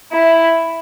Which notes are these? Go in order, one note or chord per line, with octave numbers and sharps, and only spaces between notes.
E4